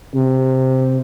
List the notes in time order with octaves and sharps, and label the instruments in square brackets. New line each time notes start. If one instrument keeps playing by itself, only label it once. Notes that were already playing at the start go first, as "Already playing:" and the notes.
[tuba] C3